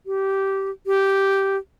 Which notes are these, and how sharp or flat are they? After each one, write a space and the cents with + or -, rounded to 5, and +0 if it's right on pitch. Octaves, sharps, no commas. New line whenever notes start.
G4 -15
G4 -5